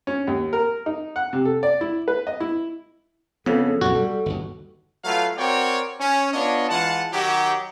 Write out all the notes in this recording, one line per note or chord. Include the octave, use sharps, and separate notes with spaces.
C#4
D#2
A#4
D#4
F#5
C3
A4
D5
E4
B4
D#5
E4
F2 C#3 B3 A4
B1 F#2 A2 F#4
G3
G1 D#2
F#3 A3 F4 B4 F5
C4 F#4 A#4 C#5 D5 G5
C#4
B3 D4 F4 C#5 D#5
E3 G#3 F4 F#5 A5
D#3 F#3 D#4 F#4 G4